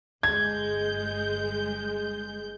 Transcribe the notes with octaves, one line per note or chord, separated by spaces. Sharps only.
G1 G#3 G6 G#6